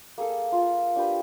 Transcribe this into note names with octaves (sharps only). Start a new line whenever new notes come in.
A#3 G#4 A4
F4
D4 G4 B4